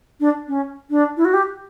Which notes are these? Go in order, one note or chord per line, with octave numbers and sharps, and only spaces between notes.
D4
C#4
D4
E4
F#4
G4